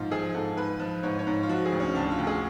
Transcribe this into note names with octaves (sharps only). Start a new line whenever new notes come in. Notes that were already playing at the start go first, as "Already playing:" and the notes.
Already playing: G#2 F3 F4
F3 G#4
G#2 A4
G#2 B4
F3
G#2 C#5
C#5
G#2
F4
F3 F#4
G#4
D2
C#4
D2 D4
F4
D2
G#4